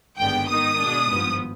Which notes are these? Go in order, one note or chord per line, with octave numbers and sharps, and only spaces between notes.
G#1 G2 D3 G#3 B3 G5
G#2 D#3 B3 D#4 D#6
B2 G#3 D4
G#1 G2 F3 B3